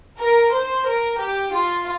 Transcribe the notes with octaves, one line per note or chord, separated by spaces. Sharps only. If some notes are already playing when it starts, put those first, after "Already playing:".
A#4
C5
A#4
G4
F4